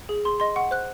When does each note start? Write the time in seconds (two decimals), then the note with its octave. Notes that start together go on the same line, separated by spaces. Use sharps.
0.09 G#4
0.25 G#4 C6
0.40 D#5 C6
0.56 F#5 C#6
0.71 C5 F#6